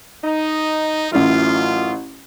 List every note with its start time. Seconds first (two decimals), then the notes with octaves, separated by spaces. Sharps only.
0.24 D#4
1.12 A1 F#2 E4 F4